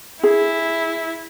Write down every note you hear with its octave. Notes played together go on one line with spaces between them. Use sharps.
E4 G#4